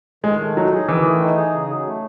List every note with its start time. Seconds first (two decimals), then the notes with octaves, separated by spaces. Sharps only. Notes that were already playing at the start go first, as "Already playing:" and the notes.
0.24 D#3 G#3
0.41 A3
0.57 F#3 D#4
0.73 G#4
0.89 D#3 E3
1.05 A3
1.21 D#4
1.37 G#4
1.53 C#3
1.70 F#3
1.86 A3